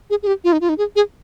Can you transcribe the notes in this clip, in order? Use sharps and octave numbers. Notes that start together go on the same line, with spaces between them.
G#4
G#4
G4
F4
D#4
F4
D#4
G#4
G#4